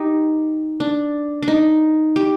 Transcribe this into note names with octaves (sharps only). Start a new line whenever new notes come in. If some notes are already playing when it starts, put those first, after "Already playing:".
Already playing: D#4 G4
D4
D4
D#4
G4